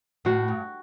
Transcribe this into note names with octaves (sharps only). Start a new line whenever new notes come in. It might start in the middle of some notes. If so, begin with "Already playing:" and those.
A2 F#4
G2